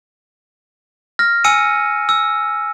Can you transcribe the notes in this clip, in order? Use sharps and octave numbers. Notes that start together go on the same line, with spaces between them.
F6 A#6
G#5 E6 C#7 D#7
E6